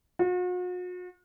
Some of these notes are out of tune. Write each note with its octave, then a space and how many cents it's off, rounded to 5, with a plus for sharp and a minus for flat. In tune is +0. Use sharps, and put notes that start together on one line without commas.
F#4 -45